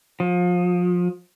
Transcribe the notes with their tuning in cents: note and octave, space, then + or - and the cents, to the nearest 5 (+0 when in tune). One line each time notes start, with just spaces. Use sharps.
F3 +30